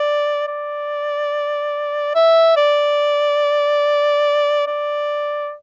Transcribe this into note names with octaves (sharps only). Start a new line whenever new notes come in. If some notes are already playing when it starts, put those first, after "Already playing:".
Already playing: D5
D5
E5
D5
D5